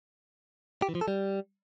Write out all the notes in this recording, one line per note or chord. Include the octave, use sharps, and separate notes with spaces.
G4
E3
F3
A4
G3